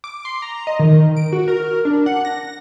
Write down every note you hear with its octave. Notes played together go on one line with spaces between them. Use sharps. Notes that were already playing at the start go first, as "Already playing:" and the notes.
D6
C6
A#5
D#5
D#3
D7
F#4
A#4
D4
F#5
A#6